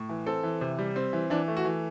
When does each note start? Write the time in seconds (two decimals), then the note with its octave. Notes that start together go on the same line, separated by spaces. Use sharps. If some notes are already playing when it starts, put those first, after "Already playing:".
Already playing: A2
0.09 E3
0.27 C4 A4
0.43 E3
0.61 C3
0.79 G3
0.96 C4
1.13 E3
1.30 E3 D4
1.48 A3
1.57 F#4
1.65 E3